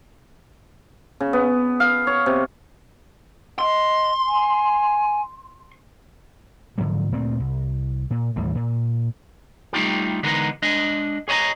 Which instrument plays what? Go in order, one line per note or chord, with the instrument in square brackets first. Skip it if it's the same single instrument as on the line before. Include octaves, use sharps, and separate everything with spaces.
[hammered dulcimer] C#3
B3
F5
C#5
C3
[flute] D#5 [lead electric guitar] C6
[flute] G#5
[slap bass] G#2 D3 F3 F#3
D2 A#2 A3 C4
C2
A#2
D#2 A2 E3 G3
A#2
[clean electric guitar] G3 A3 D#4 F4 G4
D3 E3 G#3 B3 D#4 A#4
G#3 D4 D#5
G#4 C#5 D#5 G#5 A#5